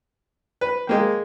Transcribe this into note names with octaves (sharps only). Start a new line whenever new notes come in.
B4
G#3 A#3 G5